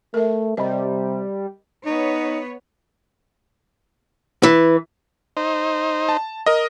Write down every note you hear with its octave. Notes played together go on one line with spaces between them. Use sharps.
A3 A#4 E5
C3 G3 D#5
B3 D#4 B4 C#5
E3
D#4 C5
A5
A#4 D#5